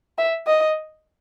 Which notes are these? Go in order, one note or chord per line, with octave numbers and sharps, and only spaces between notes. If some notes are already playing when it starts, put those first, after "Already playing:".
E5
D#5